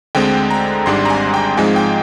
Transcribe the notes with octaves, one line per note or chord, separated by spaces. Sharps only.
D2 D3 G#3 C4 G5
A#5
G#1 G#2 G3 D4 C6
A#5
G#5
G5
G#2 F3 G#3 C4 D#4 G#5
G5